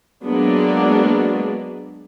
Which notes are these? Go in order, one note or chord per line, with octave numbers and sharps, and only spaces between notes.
F#3 G#3 A#3 B3 D4